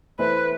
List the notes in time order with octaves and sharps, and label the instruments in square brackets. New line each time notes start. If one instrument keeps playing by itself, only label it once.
[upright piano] E3 A3 E4 A4 C5 [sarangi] B4